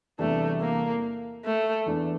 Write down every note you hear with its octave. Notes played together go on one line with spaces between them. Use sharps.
E2 C3 E3 G3 A3 D4
A#3
A3
E2 E3 A3 D4